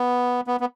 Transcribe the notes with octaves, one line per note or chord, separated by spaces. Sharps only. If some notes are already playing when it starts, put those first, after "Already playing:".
Already playing: B3
B3
B3